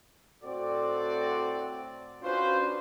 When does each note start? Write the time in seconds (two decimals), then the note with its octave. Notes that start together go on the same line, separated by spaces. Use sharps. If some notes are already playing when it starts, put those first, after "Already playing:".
0.44 A2 C4 F#4 A4 D5
2.23 C#4 D4 F4 F#4 B4 C5